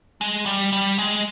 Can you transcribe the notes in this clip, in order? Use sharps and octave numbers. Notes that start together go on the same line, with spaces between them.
G#3
G3
G3
G#3